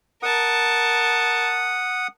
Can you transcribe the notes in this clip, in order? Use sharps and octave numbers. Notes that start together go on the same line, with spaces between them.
A#4 F#5 A5 D#6